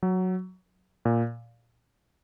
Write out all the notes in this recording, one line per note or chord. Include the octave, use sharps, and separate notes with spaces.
F#3
A#2